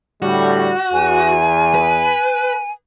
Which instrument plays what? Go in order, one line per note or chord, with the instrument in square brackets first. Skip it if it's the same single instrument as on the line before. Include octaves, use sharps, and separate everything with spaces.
[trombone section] A2 D3 G3 [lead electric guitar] F#4
[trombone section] E2 [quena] G#5
[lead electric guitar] B4